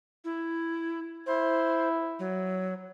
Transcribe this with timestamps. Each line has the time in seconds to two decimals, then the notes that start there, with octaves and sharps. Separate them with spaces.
0.25 E4
1.26 E4 C5
2.19 F#3